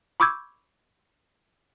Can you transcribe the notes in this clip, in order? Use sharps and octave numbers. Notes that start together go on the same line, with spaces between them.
B5 C#6 D6 E6 G6 G#6